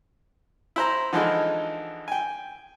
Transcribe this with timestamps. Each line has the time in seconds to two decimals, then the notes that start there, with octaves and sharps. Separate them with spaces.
0.76 E4 C5 A#5
1.13 D3 E3 F3 G#3 D#4
2.08 G5 G#5